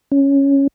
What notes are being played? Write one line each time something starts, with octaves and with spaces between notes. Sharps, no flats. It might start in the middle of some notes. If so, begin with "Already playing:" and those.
C#4